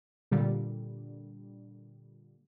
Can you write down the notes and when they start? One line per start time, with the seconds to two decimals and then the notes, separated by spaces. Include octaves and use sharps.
0.31 A#2 D3 G3